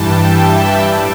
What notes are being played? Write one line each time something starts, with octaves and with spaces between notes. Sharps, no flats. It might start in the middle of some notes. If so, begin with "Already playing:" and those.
Already playing: G2 E3 G3 G5 A5
E5
D5
A2 G3